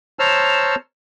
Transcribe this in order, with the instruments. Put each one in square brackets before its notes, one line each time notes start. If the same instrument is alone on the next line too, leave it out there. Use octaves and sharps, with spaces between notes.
[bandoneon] C5 C#5 A5 A#5 E6 F6